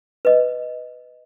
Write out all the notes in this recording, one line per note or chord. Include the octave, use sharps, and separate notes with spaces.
B4 D#5